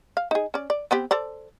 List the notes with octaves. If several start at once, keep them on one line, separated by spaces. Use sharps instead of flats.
F5
D#4 G#4
C#4 D5
D5
B3 C4 G4
A4 C5 D5